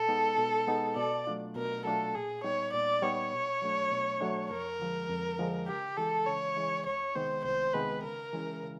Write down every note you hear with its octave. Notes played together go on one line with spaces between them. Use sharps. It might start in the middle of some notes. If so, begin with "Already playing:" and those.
Already playing: B2 A4
G#3 B3 D#4
B2
G#3 B3 D#4
B2 D5
F#3 A3 D4 F4
B2 A#4
F#3 A3 D4 F4 A4
A#2 G#4
G3 B3 D#4 C#5
A#2 D5
G3 B3 D#4 C#5
B2
F#3 A3 D4
B2
F#3 A3 D4
F2 A#4
D3 F3 G#3
F2
D3 F3 G#3
C#3 G4
E3 G#3 A4
C#3 C#5
E3 G#3
C2 C#5
C3 D#3 G#3 B3 C5
C2 C5
C3 D#3 G#3 B3 B4
C#3 A#4
E3 G#3 C#4 E4
C#3